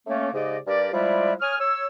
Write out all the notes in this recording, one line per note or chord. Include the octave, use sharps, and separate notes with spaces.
A3 A#3 C#4
G#2 C#3 G4 D5 D#5
G2 G4 A#4 D5
F3 G3 G#3 E4 D5 E5
C#5 G#5 D#6 F6
C#5 E6